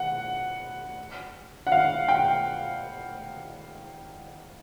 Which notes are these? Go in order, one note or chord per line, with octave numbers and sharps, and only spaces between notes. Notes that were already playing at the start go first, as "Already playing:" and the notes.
Already playing: F#5
F#5
F5
G5